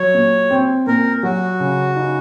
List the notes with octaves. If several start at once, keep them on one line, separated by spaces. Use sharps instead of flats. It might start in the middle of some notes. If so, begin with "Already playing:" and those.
Already playing: F#3 C#5
A#2
C4
A#2 A#4
F#3 F#4
C#3
D#4